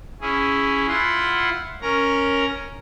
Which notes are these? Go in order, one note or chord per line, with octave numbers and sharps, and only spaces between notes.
C#4 E4 G#4
E4 F4 F#5 C6
C#4 A#4 A#5